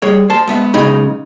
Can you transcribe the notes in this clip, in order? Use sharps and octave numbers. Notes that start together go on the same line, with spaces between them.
G3 G#4 C#5
C5 A5
G#3 B3 E5
B1 C#3 G#3 D#4 B5